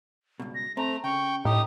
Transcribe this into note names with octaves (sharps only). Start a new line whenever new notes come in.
C#2 G2 B2
A#6
A3 C4 A#5
C#3 G5 C#6
A2 D#4 G4 D#6